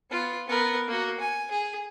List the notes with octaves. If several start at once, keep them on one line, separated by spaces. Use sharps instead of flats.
B3 F4
B3 A#4
A#3 F#4
G#5
G#4